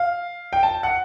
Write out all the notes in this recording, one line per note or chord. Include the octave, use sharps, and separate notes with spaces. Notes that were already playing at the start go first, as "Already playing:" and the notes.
Already playing: F5
G5
A5
F#5